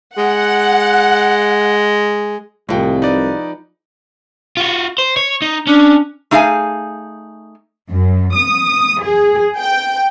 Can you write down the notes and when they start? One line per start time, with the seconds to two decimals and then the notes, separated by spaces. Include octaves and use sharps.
0.18 G#3 F#5
2.69 C2 A2 F3 G#3 G5
3.02 D#4 B4 D5
4.57 F4 F#4
4.98 C5
5.17 C#5
5.42 D#4
5.67 C#4 D4
6.31 A3 D#4 G#4 F5 G5 G#5
7.90 F#2
8.35 D#6
9.02 G#4
9.58 G5